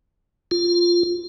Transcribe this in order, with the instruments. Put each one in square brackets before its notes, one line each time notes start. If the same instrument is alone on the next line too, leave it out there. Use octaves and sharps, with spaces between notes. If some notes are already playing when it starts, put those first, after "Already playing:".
[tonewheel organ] F4